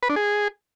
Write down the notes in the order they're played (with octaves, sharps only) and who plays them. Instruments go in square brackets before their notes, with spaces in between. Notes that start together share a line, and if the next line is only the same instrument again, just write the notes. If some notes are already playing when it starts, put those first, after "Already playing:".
[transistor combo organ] B4
D4
G#4